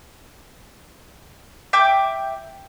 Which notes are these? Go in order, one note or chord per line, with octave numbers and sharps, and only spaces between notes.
E5 G5 D6 G6